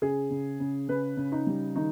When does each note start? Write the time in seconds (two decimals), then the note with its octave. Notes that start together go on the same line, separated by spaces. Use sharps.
0.02 C#3 G#4
0.30 C#3
0.60 C#3
0.88 C#3 B4
1.17 C#3
1.32 D#4
1.47 G3
1.75 D#3 D#4